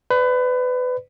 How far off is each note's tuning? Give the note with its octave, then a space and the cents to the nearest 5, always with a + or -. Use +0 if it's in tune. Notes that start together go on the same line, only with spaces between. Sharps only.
B4 +25 D5 +0